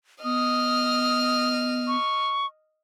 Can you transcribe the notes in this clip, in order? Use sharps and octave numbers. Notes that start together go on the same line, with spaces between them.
B3 D#5 D#6 F6
C#6